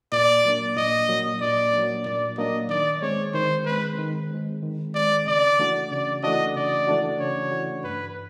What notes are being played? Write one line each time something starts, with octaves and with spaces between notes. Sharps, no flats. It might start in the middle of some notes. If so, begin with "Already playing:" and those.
A#2 D5
F#3 A#3 D4
A#2 D#5
F#3 A#3 D4
A#2 D5
F#3 A#3 D4
A#2 D5
F#3 A#3 D4 D#5
D#3 D5
G#3 C4 C#5
D#3 C5
G#3 C4 B4
D#3
G#3 C4
D#3
G#3 C4 D5
C#3 D5
E3 A3 D4 F#4
C#3 D5
E3 A3 D4 F#4 D#5
C#3 D5
E3 A3 D4 F#4
C#3 C#5
E3 A3 D4 F#4
G2 B4